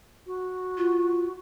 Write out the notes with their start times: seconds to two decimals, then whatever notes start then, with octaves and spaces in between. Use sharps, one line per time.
0.27 F#4
0.77 F4